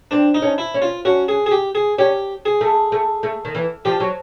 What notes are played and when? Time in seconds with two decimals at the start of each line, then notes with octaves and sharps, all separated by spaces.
0.11 C4 D4
0.34 D#4
0.42 C#4
0.58 E4
0.74 C#4
0.82 F4
1.05 C#4 F#4
1.28 G#4
1.46 G#4
1.51 G4
1.75 G#4
1.98 C#4 G4
2.45 G#4
2.61 A3
2.92 A3
3.23 A3
3.45 D#3
3.55 E3
3.85 F3 G4
4.00 F#3